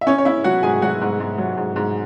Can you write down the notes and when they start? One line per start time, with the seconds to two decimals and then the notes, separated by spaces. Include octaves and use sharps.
0.01 E5
0.07 C#4 C#5
0.18 C#5
0.25 C#4 E4 E5
0.44 F#3 F#4 F#5
0.63 G#2 G#4 G#5
0.82 F#3 F#4 F#5
1.01 G#2
1.20 G#2
1.38 F#3
1.57 G#2
1.76 G#2